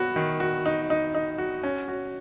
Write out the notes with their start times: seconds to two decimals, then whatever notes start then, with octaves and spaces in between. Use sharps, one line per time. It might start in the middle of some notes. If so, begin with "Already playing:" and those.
Already playing: B3 F#4
0.16 D#3
0.40 F#4
0.66 D#4
0.90 D#4
1.15 D#4
1.38 F#4
1.63 C#4
1.88 F#4